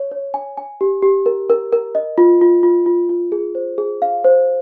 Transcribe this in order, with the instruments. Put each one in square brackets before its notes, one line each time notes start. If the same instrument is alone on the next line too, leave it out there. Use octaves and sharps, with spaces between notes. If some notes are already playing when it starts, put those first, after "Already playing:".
Already playing: [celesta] C#5
C#5
G#5
G#5
G4
G4
A#4
A#4
A#4
D#5
F4
F4
F4
F4
F4
G#4
C5
G#4
F5
C5